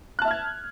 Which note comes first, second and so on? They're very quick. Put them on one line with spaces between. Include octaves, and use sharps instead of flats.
F#6 A5 E5 F6 G#6